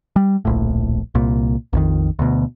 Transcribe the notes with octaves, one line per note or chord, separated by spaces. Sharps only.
G3
D1 A#1 A2
C2 A#2
A#1 F2 D#3
D2 B2